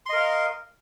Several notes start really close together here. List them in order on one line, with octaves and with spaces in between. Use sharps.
C6 D#5 A#4 F5